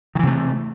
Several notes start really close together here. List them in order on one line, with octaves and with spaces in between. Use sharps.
D#3 E3 C3 A3